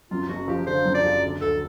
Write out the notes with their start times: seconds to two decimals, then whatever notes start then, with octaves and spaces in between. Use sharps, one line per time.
0.11 F#2 F4
0.29 F#1 F#4
0.48 F3 G4
0.67 D3 C5
0.85 F#2
0.94 D5
1.03 F#1
1.23 D3
1.41 D2 A4